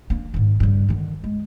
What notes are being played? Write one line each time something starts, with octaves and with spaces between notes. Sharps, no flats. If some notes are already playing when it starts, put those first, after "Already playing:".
A#3 D4
G#2 D#3
G2 C#3
D3 D#3
G#3